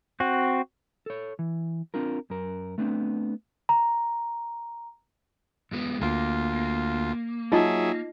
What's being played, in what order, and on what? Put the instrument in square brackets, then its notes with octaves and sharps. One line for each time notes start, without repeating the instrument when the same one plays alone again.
[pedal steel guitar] C4 F#4
[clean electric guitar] A4 C#5
E3
C4 D4 F4 A#4
F#2 A#4
A3 B3 C4 D4
[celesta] A#5
[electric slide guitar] F#2 G#3 B3
[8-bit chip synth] D2 F4 [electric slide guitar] A#3
[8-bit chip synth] F#3 G#4 E5 [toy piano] D#4 F4 D#5